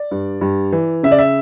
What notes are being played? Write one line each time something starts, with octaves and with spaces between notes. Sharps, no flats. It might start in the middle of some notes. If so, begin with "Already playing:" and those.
Already playing: D5
G2
G2
E3
C#3 E5
D5
E5